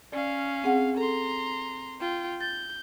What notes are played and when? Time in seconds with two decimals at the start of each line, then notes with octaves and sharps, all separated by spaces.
0.12 C#4 D5 F5
0.64 C4 G#4 F#5
0.97 A4 A#5 C6
2.01 F4 G5
2.41 G6 A6